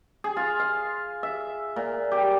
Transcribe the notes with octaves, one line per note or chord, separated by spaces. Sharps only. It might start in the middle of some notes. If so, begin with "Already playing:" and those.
G#4
F4
F5
E5
A#2
G4